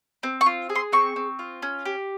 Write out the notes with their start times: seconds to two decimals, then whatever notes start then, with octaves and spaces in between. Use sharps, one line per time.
0.23 C4
0.41 C#6
0.46 F4
0.70 G#4
0.75 C6
0.92 C4 C#6
1.16 C4
1.39 F4
1.62 C#4
1.85 G4